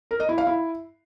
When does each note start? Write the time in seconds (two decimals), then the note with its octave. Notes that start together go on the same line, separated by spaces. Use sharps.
0.11 A#4
0.20 D#5
0.29 E4
0.38 F5
0.47 E4